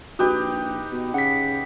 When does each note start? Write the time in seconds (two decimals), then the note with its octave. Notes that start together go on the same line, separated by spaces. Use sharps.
0.19 A#1 D#4 F#4 G4 B4
0.92 B2
1.14 C#3 F#5 B6